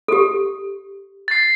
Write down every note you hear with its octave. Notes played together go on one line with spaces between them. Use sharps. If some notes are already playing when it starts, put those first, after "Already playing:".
G4 A4
A6 C7